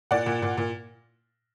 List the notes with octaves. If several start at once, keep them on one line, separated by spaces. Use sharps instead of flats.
A#2 D5 F#5
A#2
A#2
A#2